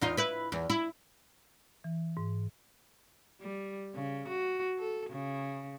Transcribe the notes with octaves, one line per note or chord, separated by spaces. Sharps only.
E2 D#4 F4
E4 B4
E2
E4
E3
G#2
G3
C#3
F#4
A4
C#3